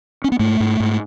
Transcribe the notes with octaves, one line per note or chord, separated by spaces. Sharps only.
C#4
B3
G#2 A3
G#2
G#2